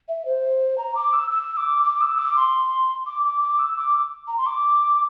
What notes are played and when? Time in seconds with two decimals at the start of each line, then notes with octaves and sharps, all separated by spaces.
0.08 E5
0.25 C5
0.78 A#5
0.95 D6
1.13 E6
1.31 E6
1.57 D6
1.83 D6
2.01 E6
2.18 D6
2.36 C6
3.06 D6
3.24 D6
3.41 D6
3.59 E6
3.76 D6
4.28 A#5
4.38 C6
4.46 D6